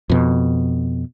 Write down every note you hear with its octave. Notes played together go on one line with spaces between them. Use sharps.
F2 B2